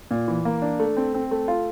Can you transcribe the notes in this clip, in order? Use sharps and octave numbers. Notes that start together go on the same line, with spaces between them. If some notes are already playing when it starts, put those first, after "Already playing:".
A#2
E3
A#3
D4
A3
C4
C4
A3
F4